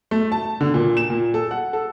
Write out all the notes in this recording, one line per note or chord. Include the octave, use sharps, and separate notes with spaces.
A3
A5
D3
A#2
E7
A#2
A4
F#5
A4